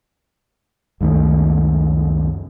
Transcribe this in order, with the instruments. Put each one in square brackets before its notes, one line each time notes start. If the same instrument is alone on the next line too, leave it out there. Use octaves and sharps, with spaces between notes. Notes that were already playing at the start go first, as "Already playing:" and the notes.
[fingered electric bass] C#2 F#2 D#3 A3